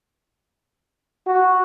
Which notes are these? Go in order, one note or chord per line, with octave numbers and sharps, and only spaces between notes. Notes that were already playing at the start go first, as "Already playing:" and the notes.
F#4